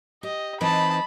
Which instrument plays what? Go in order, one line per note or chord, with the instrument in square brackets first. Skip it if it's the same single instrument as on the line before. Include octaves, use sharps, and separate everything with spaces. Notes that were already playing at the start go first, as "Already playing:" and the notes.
[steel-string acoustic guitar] G4 [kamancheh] D#5
[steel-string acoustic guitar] E3 C4 D#4 [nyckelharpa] D#5 A5 [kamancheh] B5